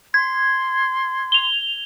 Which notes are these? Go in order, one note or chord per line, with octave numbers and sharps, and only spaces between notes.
C6 G#6
F7 G7